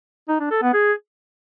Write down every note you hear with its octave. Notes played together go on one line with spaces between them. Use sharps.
D#4
D4
A4
B3
G#4